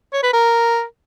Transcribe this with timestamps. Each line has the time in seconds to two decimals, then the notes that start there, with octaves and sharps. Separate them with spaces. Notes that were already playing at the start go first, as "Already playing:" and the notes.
0.13 C#5
0.23 B4
0.33 A#4